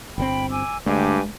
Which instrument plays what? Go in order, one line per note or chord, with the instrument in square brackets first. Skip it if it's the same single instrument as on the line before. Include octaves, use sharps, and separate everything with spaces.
[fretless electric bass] G1 D3 C4 [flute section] G5 B5
[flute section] G#5 D6 E6
[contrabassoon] D2 [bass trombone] G2 [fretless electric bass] G#3 [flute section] G4 G#5 D6